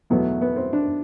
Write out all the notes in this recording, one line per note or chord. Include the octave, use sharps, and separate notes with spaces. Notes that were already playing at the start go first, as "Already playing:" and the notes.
E2 B2 F#3 A3 B3
B3
C4
D4